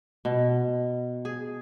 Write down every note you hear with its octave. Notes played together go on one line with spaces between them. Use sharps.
B2
G#4